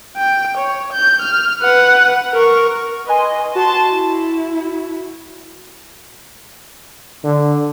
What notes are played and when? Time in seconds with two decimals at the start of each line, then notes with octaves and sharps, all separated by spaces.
0.17 G5
0.58 C#5
0.93 G6
1.22 F6
1.61 B4 F#5
2.33 A#4 C#6
3.07 B4 D#5 G#5 C6
3.55 F#4 A5 C6
3.91 E4
7.24 D3